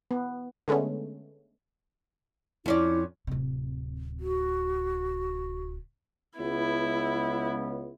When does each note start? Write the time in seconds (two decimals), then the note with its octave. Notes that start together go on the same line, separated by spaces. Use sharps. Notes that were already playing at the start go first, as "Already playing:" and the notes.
0.11 B3
0.68 D3 G#3 A3 B3 C#4
2.66 F2 C#4 E4 D5
3.27 D1 C3
4.20 F#4
6.39 C#2 B3 E4